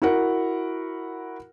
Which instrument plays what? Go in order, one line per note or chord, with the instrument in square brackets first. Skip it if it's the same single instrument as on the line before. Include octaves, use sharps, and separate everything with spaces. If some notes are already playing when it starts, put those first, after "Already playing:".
[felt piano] E4 F#4 A#4 F#5